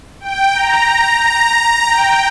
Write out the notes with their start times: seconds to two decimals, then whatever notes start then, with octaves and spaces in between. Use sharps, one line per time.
0.20 G5
0.54 A#5
1.20 A#5
1.87 G5